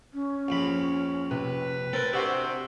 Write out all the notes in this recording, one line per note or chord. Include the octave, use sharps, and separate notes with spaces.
C#4
A#1 F2 B5
C3 B4
C4 A4 A#4
C3 D4 F#4 C5